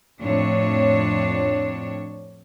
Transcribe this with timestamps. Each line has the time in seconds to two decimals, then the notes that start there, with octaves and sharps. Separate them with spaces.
0.21 F2 A2 D4 C#5